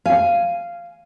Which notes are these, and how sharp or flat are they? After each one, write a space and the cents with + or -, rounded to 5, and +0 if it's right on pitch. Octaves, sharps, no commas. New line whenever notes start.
F5 -10 G#5 +0